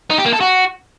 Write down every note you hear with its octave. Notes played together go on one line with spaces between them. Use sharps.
D#4
G4
A#3
A4
F#4